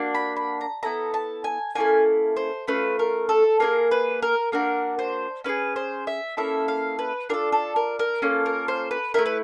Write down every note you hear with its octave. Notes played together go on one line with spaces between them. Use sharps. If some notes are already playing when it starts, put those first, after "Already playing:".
Already playing: A#3 D4 F#4
B5
B5
A#5
B3 E4 A4 A#5
A5
G#5
A#3 C#4 E4 A4 G#5
C5
A3 C#4 F4 B4
A#4
A4
A#3 D#4 G#4 A#4
B4
A#4
A#3 D4 F#4 A#4
C5
C#4 E4 G#4 B4
C5
E5
A#3 C#4 E4 A4 E5
F5
B4
D4 F4 A4 A#4
A4
A#4
A#4
A#3 C#4 F4 A4
A#4
C5
B4
A3 C4 E4 A#4
B4